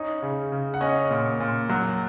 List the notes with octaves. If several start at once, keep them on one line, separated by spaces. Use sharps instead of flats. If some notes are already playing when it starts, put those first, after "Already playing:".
Already playing: C#4 D#4
C#3
C#3
F#5
C#4 D#5
A#2
A#2
F#3